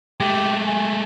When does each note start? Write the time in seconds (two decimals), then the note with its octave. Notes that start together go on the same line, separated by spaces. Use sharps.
0.20 G#3 A3 G4
0.66 G#5